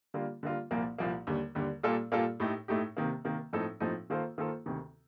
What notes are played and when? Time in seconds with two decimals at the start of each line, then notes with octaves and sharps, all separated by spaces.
0.14 D3 G3 A#3 F4
0.43 D3 G3 A#3 F4
0.71 C2 A#2 F3 A#3
0.98 C2 A#2 F3 A#3
1.27 D#2 D3 G3
1.55 D#2 D3 G3
1.83 A#2 G3 A#3 F4 A4
2.12 A#2 G3 A#3 F4 A4
2.40 A2 A3 D#4 G4
2.68 A2 A3 D#4 G4
2.97 C3 D#3 A#3
3.24 C3 D#3 A#3
3.53 A2 F3 C4 D#4 A4
3.80 A2 F3 C4 D#4 A4
4.10 D#3 A#3 F4 A4 C5
4.38 D#3 A#3 F4 A4 C5
4.66 D2 C3 D#3